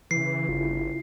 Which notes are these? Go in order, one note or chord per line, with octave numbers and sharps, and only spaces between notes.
C#3 E3 C7
G1 E4 F4